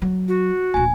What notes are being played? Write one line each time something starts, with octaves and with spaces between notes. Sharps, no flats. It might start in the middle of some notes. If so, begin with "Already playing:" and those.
F#3
F#4
D1 A#1 G#5